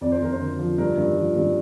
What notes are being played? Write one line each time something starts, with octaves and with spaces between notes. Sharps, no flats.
F2 D5
C5
F2 A#4
C5
D3
F3
G2 A#4
G2
F3
G2